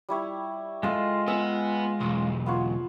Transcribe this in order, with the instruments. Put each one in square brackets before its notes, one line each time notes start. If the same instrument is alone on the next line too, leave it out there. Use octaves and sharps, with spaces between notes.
[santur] G3 E4 C#5
[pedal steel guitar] G#3 F4 [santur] A4 D#5 A5
[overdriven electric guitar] B3 [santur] G#4 D#5 E6
[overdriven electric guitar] B1 E2 [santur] D#5 A5
[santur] B3 F4 C#5